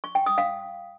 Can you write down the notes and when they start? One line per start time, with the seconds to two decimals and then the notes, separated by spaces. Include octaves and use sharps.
0.04 C#6
0.15 G5
0.26 D#6
0.38 F5